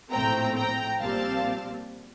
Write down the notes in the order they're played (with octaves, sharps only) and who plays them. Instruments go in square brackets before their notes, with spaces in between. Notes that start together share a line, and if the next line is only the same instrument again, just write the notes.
[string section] A#1 A2 A3 C4 G5 A#5
G5 A#5
A#1 A#2 G3 C4 F5 A5